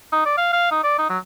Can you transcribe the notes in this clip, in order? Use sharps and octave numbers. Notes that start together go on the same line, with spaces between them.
D#4
D5
F5
F5
D#4
D5
D#4
F#3